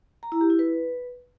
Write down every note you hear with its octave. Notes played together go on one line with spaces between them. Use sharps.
A#5
E4
G4
E4
B4